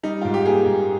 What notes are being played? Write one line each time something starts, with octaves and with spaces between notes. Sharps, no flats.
G3 D#4
G#2 F4
G4
A#3 G#4
G#2